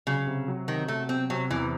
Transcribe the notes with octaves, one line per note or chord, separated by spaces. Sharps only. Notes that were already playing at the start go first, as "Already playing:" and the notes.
C#3 F#3
C3
F#3
C3 D#3
C3 A3
C3 C4
C3 F#3
E2 E3